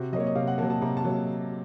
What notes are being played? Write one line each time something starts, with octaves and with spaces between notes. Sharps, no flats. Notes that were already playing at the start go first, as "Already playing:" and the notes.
Already playing: C3 F#4
F#3 A#3 C#5 D#5
D#5
C3 F5
F#5
F#3 A#3 A5
A5
C3 A#5
A5
F#3 A#3